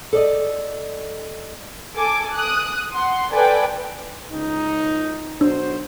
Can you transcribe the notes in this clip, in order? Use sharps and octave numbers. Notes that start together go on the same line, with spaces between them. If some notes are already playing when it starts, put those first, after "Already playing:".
A4 D5 D#5
A4 G#5 D6
D#6 F#6
F#5 C6
A4 B4 D5 G5 G#5
C#2 D#4
B1 D4 F#4 C5